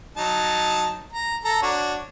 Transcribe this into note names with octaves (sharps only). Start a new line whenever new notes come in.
F#3 D#4 A5
A#5
A4 A#5
D4 F#4 C#5